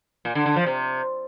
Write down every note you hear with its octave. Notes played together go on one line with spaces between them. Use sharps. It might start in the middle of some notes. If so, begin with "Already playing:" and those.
A#2
D3
D3
F3
C3